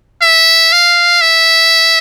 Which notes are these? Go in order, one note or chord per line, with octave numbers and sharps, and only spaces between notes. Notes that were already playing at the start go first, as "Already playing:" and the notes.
E5
F5
E5